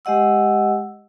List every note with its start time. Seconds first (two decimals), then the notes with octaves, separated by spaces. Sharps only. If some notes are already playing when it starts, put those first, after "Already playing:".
0.05 G#3 G4 D#5 F#5 E6